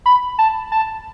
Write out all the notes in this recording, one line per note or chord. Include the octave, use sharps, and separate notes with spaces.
B5
A5
A5